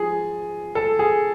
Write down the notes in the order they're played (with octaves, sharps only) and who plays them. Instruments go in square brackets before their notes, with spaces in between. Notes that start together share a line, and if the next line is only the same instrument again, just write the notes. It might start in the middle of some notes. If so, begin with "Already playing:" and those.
Already playing: [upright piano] F3 G#4
A4
G#4